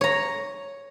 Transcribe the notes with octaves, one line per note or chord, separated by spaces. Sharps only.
C#5 A#5